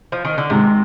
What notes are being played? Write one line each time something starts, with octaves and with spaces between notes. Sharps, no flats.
F3
D#3
D3
G#2 C3 D#3 G#3